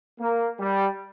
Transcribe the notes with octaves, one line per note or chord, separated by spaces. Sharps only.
A#3
G3